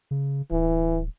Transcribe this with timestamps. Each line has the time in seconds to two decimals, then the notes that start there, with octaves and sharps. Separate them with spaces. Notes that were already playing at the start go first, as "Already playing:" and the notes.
0.11 C#3
0.51 D1 E3